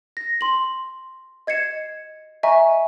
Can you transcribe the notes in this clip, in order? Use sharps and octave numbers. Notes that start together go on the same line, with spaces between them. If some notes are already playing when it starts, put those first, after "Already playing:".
A#6
C6 F#7
D#5 G#6 C7 C#7 E7
D#5 E5 G#5 A#5 C#6